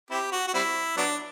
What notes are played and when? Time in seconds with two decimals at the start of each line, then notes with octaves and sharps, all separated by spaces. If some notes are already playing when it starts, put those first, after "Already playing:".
0.11 C4 E4 G4
0.32 F#4
0.47 F#4
0.54 G3 C4 E4
0.97 F#3 B3 D4